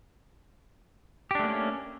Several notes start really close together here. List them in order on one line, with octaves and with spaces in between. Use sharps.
G4 D4 A3 A#3 C#4